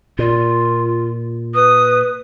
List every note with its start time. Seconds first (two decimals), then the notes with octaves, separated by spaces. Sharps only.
0.19 A#2 F4
1.55 B4 D#6